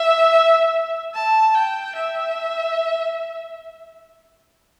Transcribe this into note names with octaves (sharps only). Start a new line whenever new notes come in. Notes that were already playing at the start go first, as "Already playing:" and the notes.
Already playing: E5
A5
G5
E5